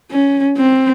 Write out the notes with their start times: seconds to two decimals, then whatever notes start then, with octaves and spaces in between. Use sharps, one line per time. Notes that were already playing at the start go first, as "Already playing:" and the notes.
0.11 C#4
0.57 C4